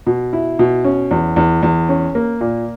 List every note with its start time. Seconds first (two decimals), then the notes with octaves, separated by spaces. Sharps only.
0.06 B2
0.33 E4
0.59 B2
0.85 C#4
1.11 E2
1.36 E2
1.63 E2
1.89 C#4
2.15 A#3
2.41 A#2